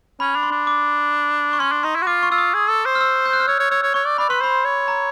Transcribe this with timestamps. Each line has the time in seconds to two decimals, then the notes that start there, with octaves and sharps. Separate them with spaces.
0.20 C#4 B5
0.34 D4 B5
0.43 C6
0.51 D4
0.67 D6
1.53 C#6
1.60 C#4 C6
1.72 D4
1.83 D#4 C6
1.95 E4
2.02 F#4
2.06 F4 D6
2.23 C#6
2.31 F4 E6
2.38 D#6
2.54 G#4
2.69 A4
2.85 C5
2.95 F6
3.01 E6
3.26 G6
3.33 F#6
3.40 F6
3.48 C#5 E6
3.60 C#5
3.71 C#5 E6
3.82 C#5
3.94 C#5 C#6
4.06 D5
4.18 D5 B5
4.29 B4 C6
4.41 C5 B5
4.65 C#5
4.88 A#5